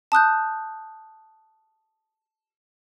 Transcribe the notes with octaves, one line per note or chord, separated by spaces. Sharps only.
A5 D#6 F#6 G6